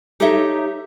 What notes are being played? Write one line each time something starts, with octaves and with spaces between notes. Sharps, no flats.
D#4 G4 A4 C#5 D#5 E5